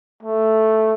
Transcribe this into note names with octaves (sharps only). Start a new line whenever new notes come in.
A3